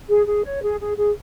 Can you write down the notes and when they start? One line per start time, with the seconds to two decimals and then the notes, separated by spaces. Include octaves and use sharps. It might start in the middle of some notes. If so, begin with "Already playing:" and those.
0.08 G#4
0.26 G#4
0.44 C#5
0.62 G#4
0.80 G#4
0.98 G#4